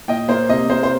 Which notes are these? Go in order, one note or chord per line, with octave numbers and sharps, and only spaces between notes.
A#2 D#5 G5
A#3 C5
C3 D#5
A#3 C5
C5